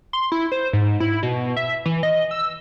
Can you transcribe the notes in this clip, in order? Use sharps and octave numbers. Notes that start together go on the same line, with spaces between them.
C6
E4
C5
G#2
E4
B2
E5
E3
D#5
E6